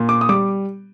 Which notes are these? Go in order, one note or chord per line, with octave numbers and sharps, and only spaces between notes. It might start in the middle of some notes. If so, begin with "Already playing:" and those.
Already playing: A#2
D6
D#6
G3 D6